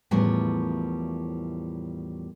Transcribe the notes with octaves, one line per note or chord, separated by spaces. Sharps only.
E2 A2 F3 G3 A#4 C#5